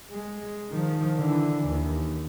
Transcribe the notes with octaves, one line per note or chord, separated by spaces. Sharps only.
G#3
D#3 F3
D3 E3
D#2